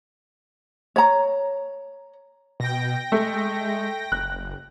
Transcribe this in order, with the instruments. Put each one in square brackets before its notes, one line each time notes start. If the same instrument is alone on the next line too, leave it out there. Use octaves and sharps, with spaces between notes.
[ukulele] C#5 A#5
[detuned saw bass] B2 [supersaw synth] G5 A#6
[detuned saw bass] G#3 [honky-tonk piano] A3
[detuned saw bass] F#1 [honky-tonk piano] F#6